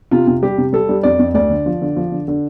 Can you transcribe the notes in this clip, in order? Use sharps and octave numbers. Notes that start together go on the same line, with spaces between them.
C3 F4
C3
G3 G4
C3
G3 A4
G3
F2 D5
F2
D2 D5
D3
F3
D3
F3
D3
D3